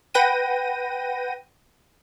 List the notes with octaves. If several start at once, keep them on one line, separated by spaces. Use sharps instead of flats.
B4 F#5 G5 A#6 D#7